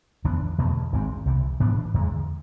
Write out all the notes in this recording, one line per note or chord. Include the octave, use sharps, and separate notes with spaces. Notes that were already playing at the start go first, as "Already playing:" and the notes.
F2 E3 B3 D4
E2 B2 A3
G#1 G#2 G#3 C4
C2 C3 E3
G#2 E3 B3 D4
E2 D3 G#3